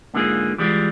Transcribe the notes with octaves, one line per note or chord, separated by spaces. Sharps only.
G#2 D3 A#3 F4 G#4
E3 G3 G#3 F4